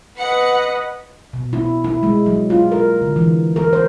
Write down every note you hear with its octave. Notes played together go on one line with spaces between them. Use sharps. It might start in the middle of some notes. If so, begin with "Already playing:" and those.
B4 D#5 F#5 C#7
B2
E4
E4
G#3
F#3
F4
A#4
D3
E3
A#4
C5